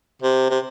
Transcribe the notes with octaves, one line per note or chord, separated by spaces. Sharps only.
C3
C3